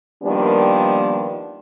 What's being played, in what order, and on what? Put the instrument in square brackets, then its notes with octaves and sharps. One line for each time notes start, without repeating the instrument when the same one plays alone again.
[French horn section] D#3 F3 G3 A#3 B3 D4